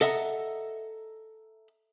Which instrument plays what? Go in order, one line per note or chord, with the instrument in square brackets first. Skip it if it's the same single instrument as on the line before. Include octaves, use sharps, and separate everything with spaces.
[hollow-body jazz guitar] A4 D#5 E5 F#5 A#5